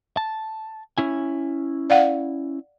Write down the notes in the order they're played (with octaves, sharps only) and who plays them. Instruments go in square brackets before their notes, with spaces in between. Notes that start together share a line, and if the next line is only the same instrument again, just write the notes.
[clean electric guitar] A5
C#4 E4 G#5
[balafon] D5 F5 F#5